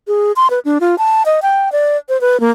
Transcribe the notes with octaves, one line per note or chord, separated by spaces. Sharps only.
G#4
C6
B4
D4
F4
A5
D#5
G5
D5
C5
B4
A#3